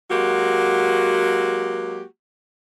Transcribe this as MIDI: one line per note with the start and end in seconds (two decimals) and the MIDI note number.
0.11 2.04 54
0.11 2.04 56
0.11 2.04 58
0.11 2.04 66
0.11 2.04 67